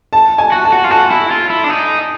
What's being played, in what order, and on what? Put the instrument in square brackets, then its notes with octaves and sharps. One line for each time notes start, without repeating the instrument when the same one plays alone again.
[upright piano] A5
G#5
[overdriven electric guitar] F#4
[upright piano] A5
[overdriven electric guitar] F#4
F4
[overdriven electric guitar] F#4 [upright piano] A5
[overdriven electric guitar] E4
F4
E4
D4
D#4